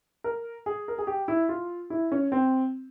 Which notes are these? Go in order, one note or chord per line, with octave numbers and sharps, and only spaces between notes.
A#4
G#4
A#4
G#4
G4
E4
F4
E4
C#4
C4